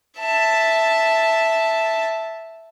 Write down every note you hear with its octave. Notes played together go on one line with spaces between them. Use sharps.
E5 A5